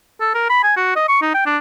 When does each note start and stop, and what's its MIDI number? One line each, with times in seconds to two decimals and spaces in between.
0.21 0.30 69
0.35 0.46 70
0.50 0.63 83
0.63 0.73 80
0.77 0.91 66
0.96 1.05 75
1.08 1.17 85
1.22 1.33 63
1.34 1.41 79
1.46 1.58 62